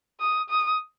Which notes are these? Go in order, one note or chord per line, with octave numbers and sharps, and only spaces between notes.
D#6
D#6